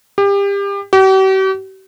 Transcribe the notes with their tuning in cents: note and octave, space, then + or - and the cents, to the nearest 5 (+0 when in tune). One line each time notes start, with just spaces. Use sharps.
G4 +30
G4 -45